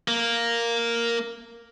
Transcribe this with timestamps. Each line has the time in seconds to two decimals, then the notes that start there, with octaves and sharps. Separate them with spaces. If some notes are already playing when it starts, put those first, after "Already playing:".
0.08 A#3